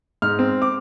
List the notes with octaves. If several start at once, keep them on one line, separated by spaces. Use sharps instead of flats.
G#2 F6
C4
D6